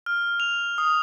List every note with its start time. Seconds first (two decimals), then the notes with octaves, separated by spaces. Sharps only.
0.06 F6
0.40 F7
0.78 D#6